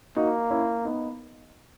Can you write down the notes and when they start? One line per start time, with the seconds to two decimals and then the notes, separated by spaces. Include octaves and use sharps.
0.16 A#3 D#4 F#4
0.50 C#4 E4
0.85 B3 D#4